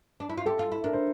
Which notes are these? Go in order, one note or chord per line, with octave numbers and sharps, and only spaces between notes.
D4
E4
F4
G4 A4
F4
E4
D4 A#4
C5